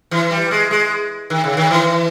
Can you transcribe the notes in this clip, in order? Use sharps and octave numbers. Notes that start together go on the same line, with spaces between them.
E3
G3
G#3
G#3
D#3
C#3
D#3
E3